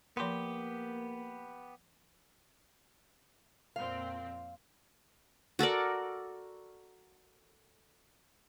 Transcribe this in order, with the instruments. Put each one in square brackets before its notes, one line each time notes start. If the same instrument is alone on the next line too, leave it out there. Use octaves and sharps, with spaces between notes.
[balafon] F3 B5 C6 [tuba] A#3 [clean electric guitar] B3 G4
[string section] F2 A#2 C4 [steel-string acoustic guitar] F5
[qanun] F#4 A4 A#4 D5